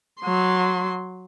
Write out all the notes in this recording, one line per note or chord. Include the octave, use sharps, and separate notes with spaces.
F#3 C6